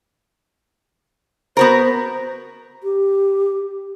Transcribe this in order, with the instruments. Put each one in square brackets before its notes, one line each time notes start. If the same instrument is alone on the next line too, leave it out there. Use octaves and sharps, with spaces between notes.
[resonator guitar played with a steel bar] B3 F#4 A#4 [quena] C5
[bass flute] G4